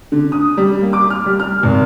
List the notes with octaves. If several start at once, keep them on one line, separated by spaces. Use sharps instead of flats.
D3
D#6
G3
A#3
D6
F6
G3
F6
G#1